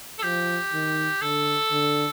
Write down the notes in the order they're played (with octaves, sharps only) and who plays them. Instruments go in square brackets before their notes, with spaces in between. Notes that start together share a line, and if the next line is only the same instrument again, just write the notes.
[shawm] A4
[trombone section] F3 [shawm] G4
[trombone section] D#3
[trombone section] D3 [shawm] A4
[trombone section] D3